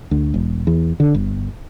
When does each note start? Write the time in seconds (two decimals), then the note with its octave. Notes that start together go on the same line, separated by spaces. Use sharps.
0.11 D2
0.34 E1
0.67 E2
1.00 D3
1.14 G1